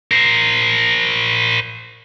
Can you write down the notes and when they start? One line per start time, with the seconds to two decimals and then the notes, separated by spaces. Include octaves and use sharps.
0.11 A#4 C5